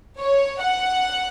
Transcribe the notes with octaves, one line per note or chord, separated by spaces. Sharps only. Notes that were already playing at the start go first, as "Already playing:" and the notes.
C#5
F#5